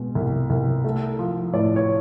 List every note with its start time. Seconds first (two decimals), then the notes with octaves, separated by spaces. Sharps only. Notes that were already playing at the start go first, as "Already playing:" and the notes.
Already playing: B2 G#3
0.15 C2
0.50 C2
0.84 A3
1.19 F3
1.53 A2 D5
1.76 C#5